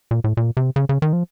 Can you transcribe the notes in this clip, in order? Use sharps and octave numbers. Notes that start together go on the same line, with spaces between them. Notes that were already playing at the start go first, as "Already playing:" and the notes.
A#2
A2
A#2
C3
C#3
C#3
D#3
F3